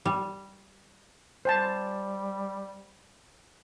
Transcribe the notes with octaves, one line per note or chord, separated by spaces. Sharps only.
G3
G3 C5 G#5 A5